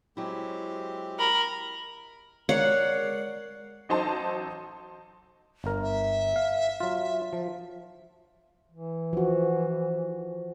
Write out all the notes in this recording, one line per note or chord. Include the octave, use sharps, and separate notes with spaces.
F#3 G#3 C4 E4 G4
A#4 B5
G#3 A#4 C#5 D5 F#5 C7
A1 F#3 D#4 C5 A5 C6
G1 A#4
E5
F5
F#3 F4
F3
E3
F3 F#4